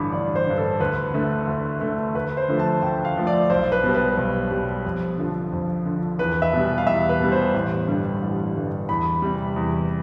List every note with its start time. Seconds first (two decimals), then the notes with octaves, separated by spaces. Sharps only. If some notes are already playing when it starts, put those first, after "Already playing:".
Already playing: A1 G2 D3 B5 D6
0.12 A1 D5
0.36 C5
0.46 G2 D3
0.58 A4
0.80 D2 B4
1.14 D3 A3
1.48 D2
1.81 D3 A3
2.15 D2 B4
2.37 C5
2.49 D3 F3 A3
2.60 A5
2.82 D2 G5
3.05 F5
3.16 D3 F3 A3
3.27 D5
3.50 B1 C5
3.72 B4
3.84 B2 G3
3.94 B4
4.17 B1
4.51 B2 G3
4.85 F2
5.18 D3 F3
5.52 F2
5.86 D3 F3
6.19 E2 B4
6.42 E5
6.53 B2 G3
6.78 F5
6.87 E2 E5
7.09 B4
7.20 B2 G3
7.32 C5
7.54 A1
7.88 G2 D3 G3
8.22 A1
8.55 G2 D3 G3
8.89 E2 B5
9.22 C3 G3
9.56 E2